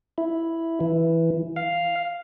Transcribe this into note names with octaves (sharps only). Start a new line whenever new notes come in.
E4
E3
F5